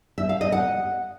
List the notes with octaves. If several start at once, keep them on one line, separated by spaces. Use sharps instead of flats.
E5
F5
D#5
F#5